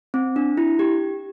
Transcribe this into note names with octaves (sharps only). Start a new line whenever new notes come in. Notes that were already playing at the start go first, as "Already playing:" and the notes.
C4
D4
E4
G4